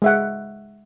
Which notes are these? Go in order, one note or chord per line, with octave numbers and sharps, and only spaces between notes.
G#3 E5 F#5